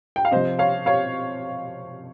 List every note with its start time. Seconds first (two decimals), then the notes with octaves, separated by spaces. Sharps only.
0.16 G5
0.25 F5
0.31 C3 F3 C5 D#5
0.59 C#5 F5
0.86 C#5 F5